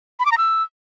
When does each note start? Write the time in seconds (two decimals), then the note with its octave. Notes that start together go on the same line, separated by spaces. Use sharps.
0.20 B5
0.26 D6
0.32 A#5
0.38 E6